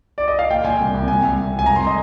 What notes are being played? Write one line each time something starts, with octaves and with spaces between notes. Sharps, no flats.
D5
D#5
F5
A#2 G5
A#2 G#5
C2
C2
C2 G#5
C2
C2
C2
G#5
F1 A#5
C6
D#5